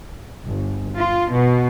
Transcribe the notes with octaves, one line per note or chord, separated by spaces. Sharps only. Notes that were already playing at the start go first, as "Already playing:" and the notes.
G1
F4
B2